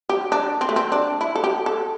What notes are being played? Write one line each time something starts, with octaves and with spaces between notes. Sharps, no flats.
G4
D4
C4
A3
C4
D4
E4
A4
G4
A4